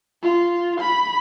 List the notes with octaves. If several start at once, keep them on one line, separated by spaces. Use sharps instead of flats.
F4
B5